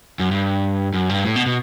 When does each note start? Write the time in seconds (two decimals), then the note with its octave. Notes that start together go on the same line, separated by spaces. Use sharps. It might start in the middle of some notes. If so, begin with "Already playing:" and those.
0.19 F#2
0.31 G2
0.94 F#2
1.10 G2
1.25 A2
1.36 B2
1.46 B2